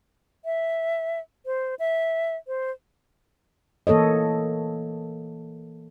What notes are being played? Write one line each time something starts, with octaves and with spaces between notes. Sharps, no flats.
E5
C5
E5
C5
E3 A#3 A4 C#5 D#5